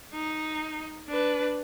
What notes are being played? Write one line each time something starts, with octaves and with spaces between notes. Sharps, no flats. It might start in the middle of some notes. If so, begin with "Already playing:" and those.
D#4
D4 B4